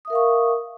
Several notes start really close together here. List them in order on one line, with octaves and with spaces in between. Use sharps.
D#6 E5 A#4 F5 C#6